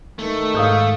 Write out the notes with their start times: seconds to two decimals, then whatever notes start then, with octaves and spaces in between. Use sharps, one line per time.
0.19 D#3 A3
0.54 G#2 F5 D#6 G6